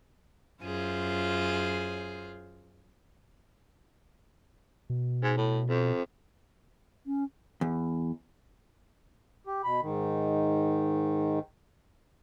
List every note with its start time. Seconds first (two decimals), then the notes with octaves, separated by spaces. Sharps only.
0.62 F#2 F4 G#4 C5
4.90 B2
5.23 G#2
5.37 A2
5.69 F2
7.06 C#4
7.61 E2
9.47 G4
9.64 B2 B5
9.82 G#2 D#3